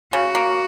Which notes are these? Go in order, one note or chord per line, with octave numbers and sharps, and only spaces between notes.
C#3 F#4
A#3